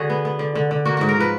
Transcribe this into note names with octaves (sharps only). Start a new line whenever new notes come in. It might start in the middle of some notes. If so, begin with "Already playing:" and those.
Already playing: D3 F#4 G#4
B3
B3
D3
D3
D3
A#3 F#4
G#2 F#4
A#4
F3 B4